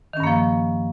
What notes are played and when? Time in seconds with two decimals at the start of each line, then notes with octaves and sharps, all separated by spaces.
0.13 D#3
0.17 C#4
0.20 G2
0.23 A#3
0.27 F3